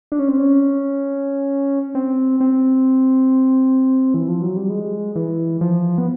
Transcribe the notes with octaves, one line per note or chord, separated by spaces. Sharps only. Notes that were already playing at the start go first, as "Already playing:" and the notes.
D4
C#4
C4
C#4
C4
C4
E3
F3
F#3
G3
G#3
E3
F3
B3